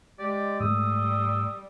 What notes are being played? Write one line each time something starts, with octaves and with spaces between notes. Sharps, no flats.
G#3 G4 D5
G#2 G3 A3 D#6 E6